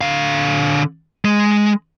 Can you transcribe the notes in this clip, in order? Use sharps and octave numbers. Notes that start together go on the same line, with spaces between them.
D3 F5
G#3